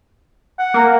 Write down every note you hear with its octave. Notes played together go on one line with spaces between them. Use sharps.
F#5
A#3